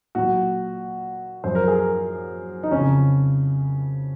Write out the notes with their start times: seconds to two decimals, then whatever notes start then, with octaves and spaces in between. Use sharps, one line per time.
0.15 A#2 F#3 F#4
1.44 F#2 F3 C5
1.55 A#4
1.68 G#4
1.79 A#4
2.63 D#4
2.71 F2 C#3 F3 C#4